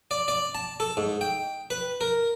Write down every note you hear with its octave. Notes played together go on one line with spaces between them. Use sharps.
D5
D5
A5
A4
G#2
G5
B4
A#4